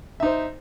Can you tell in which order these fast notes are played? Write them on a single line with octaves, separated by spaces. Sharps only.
E5 D#4 C5